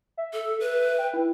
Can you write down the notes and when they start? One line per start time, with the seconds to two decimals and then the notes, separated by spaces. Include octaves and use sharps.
0.17 E5
0.33 A4
0.60 B4
0.98 G5
1.14 E4